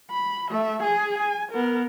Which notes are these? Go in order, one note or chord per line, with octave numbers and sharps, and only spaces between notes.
B5
A3 E5
G#4 G#5
G#5
B3 A#4